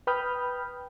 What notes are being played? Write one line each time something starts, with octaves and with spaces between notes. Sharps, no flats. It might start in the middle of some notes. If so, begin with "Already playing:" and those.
B4 G5 B5 D#6 F6 G6